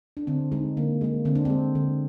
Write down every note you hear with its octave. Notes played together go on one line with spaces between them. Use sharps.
D4
D3 C4
G#3 D#4
D3 A#3
G#3 A#3
D3 C4
D4
G#3 C4
D3